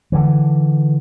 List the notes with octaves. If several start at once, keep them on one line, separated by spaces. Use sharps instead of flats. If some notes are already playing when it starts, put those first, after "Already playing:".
D3 E3